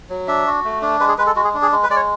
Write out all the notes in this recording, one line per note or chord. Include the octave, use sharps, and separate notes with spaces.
F#3
D4 E5
F#4
A3
D4
G#3 B4
G#4
G#3 B4
A4
G#3 F#4
G#4
D4
G#4
G#3
B4
G#3 D5
C#5